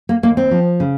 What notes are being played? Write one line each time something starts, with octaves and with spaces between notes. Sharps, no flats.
A#3
D#2 A#3
C4
F3
C#3